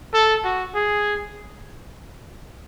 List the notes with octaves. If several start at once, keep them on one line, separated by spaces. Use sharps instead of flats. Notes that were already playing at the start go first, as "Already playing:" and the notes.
A4
F#4
G#4